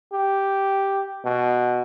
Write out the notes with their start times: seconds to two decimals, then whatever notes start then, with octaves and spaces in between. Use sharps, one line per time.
0.13 G4
1.25 B2